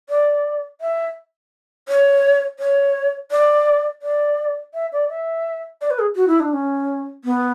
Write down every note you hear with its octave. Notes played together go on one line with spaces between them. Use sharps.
D5
E5
C#5
C#5
D5
D5
E5
D5
E5
D5
B4
G#4
F#4
E4
D4
C#4
B3